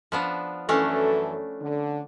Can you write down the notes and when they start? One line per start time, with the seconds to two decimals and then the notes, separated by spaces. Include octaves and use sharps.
0.12 F3 B3 D4
0.69 F#2 E3 A3 C#4 D4 A4
1.62 D3